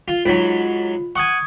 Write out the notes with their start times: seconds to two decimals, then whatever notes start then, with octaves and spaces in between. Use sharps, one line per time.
0.08 F4
0.26 G#2 F#3 F4
1.16 F#5 G#5 C#6 D#6 G#6